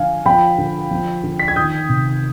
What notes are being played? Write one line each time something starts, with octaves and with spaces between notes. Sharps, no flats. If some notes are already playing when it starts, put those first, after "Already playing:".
Already playing: D3 F3 F5 G#5
F3 G5 B5
D3
F3
D3
B6
G#6
D#3 D#6 G6
C3